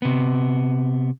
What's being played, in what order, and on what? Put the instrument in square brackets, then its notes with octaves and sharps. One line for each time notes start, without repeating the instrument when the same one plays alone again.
[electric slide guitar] C3 B3